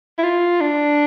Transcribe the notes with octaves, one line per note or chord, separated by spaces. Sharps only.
E4
F4
D4